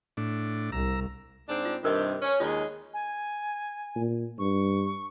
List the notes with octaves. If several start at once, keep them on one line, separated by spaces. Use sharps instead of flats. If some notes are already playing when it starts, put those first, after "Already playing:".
A2 D4
C2 A#5 E6
G#2 C4 D4
F4
G2 C3 D#3 F4 A#4 D#5
C#4
D#2 G#3 F4
G#5
A#2
G2 C#6